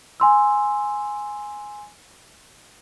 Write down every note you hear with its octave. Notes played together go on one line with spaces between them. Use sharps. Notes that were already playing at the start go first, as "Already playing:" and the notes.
G#5 C6 E6